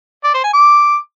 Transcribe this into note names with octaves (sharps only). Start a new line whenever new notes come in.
D5
C5
G#5
D6